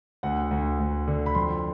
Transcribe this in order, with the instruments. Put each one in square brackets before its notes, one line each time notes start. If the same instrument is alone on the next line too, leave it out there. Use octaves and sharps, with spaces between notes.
[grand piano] D2 F#5
D2
D2
D3
B5
F2 C6